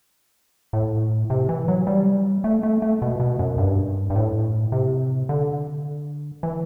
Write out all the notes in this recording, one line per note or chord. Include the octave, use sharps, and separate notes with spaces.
A2
C3
E3
F#3
G3
A3
A3
A3
B2
B2
F#2
G2
G2
A2
C3
D3
E3